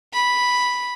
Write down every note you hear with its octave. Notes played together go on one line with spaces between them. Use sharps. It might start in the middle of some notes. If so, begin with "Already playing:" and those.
B5